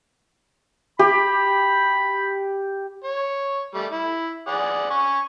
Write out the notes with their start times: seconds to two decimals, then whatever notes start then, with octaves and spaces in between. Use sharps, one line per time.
0.99 G4 B5
3.04 C#5
3.75 G3 A3
3.92 E4
4.48 G#4 D5 F#5
4.90 G#5 C#6